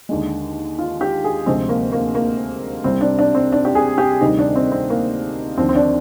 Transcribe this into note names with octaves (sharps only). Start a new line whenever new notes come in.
D#2 D3 G#3
F4
G4
G#4
D2 C3 F3 G#3 C4
A#3
A#3
A#3
C2 C3 G3 C4
D4
D4
C4
D4
G4
G#4
G4
D2 C3 D#3 G3 D#4
D4
C4
C4
A#3
D#2 D3 F3 C4
C4
D4